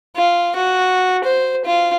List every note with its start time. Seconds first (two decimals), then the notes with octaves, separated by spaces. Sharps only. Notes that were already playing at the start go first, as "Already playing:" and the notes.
0.16 F4
0.56 F#4
1.24 C5
1.66 F4